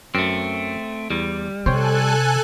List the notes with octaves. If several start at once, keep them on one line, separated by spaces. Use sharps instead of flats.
F#2 A3 C4
E2 G3
C3 A4 C5 C#5 G5 G#5 F#6